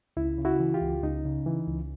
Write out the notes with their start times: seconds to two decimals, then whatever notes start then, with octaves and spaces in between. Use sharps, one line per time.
0.17 C#2 E4
0.38 C#3
0.45 E4 F#4
0.60 E3
0.74 F4 G4
0.81 C#2
1.03 C#2 D#4
1.25 C#3
1.46 E3
1.68 C#2